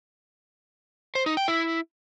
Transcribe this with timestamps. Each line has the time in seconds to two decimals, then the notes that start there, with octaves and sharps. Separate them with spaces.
1.15 C5
1.26 D#4
1.37 G5
1.48 E4